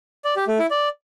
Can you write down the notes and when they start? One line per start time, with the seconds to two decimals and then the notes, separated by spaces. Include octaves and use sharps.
0.25 D5
0.36 G4
0.48 A3
0.59 E4
0.71 D5